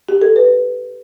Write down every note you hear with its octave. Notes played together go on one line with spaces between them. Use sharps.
G4
A4
B4